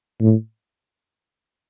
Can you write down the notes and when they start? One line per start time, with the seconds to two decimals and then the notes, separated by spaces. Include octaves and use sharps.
0.21 A2